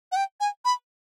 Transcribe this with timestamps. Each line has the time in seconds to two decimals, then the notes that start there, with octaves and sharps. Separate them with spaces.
0.12 F#5
0.16 G5
0.40 G#5
0.65 B5